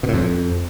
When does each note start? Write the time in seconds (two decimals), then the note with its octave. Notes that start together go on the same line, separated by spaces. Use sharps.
0.03 B2
0.08 A2
0.13 F2